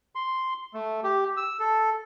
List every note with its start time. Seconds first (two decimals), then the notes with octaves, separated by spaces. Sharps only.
0.15 C6
0.74 A3
1.03 G4
1.37 E6
1.60 A4